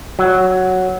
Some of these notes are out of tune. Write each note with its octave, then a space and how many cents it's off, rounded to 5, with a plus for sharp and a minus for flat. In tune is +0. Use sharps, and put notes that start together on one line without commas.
F#3 +0